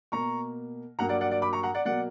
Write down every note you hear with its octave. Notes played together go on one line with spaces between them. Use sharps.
B2 A#3 A#5 C#6
G2 F#3 A#3 F#5 A#5
D5 F#5
D5 F#5
D5 F#5
B5 D6
A#5 C#6
F#5 A#5
D5 F#5
B2 F#3 A#3 D5 F#5